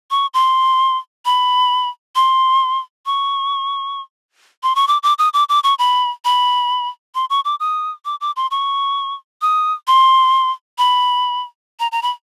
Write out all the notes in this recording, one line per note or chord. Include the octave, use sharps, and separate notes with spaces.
C#6
C6
B5
C6
C#6
C6
C#6
D6
D6
D#6
D6
D6
C#6
B5
B5
C6
C#6
D6
D#6
D6
D6
C6
C#6
D#6
C6
B5
A#5
A#5
B5